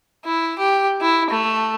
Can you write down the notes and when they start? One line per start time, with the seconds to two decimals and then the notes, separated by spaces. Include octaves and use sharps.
0.25 E4
0.58 G4
1.01 E4
1.30 A3